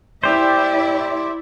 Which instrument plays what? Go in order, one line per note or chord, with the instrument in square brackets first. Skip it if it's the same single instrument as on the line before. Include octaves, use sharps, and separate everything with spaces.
[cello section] E4 D5 E5 [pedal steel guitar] G4 C5